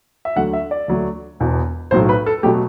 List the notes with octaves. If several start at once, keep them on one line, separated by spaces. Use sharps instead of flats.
E5
D2 D3 F#3 A3 F#5
E5
D5
D2 D3 F#3 A3
E1 E2 B2
B1 A2 F#3 C5
B4
A4
B2 F#3 A3 G4